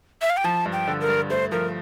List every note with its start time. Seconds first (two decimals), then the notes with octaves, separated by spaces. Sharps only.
0.22 E5
0.30 F5
0.37 G5
0.44 F3 A5
0.66 G2
0.73 G5
0.87 D3
1.01 A#4
1.09 G2
1.30 A3 C5
1.52 F3 A#4